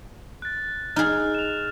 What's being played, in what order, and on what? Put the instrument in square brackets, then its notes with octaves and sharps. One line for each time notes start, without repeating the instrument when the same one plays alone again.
[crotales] F#6 A6
[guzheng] D#4 G#4 [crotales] F6
[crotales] E7 F7